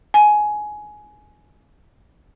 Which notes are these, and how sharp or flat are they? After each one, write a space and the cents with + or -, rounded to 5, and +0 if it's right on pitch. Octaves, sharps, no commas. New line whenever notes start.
G#5 +15